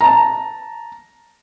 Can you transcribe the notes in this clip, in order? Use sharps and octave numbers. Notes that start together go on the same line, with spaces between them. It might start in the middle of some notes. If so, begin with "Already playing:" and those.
A5 A#5